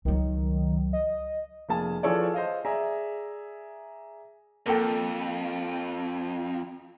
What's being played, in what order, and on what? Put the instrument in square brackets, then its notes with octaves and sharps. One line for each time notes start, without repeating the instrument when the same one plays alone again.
[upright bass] C#2 F#3 [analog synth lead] D#3
[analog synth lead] D#5
[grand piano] F1 A#3 G#4 A5
E3 F3 G#4 A4 C#5 D5
C5 D#5 F5
G#4 D5 E5 A#5
[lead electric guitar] F2 [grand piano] A#3 A4 G5